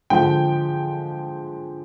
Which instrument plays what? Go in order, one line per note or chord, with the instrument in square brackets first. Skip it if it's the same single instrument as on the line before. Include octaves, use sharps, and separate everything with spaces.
[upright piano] D3 F3 G#3 G5